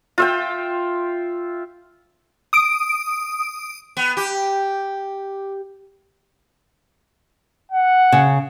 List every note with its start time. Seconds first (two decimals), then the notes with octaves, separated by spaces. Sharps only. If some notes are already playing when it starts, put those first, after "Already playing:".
0.18 F4 E5 G5
2.53 D#6 D7
3.97 B3
4.17 G4
7.72 F#5
8.12 C#3